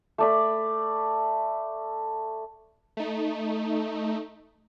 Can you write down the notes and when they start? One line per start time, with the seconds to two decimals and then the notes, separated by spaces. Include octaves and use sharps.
0.18 A3 D5 B5
2.97 A3 D#4